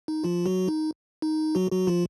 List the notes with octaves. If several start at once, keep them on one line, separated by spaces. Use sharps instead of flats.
D#4
F3 F4
F#3 F#4
D#4
D#4
F#3 F#4
F#3 F#4
F3 F4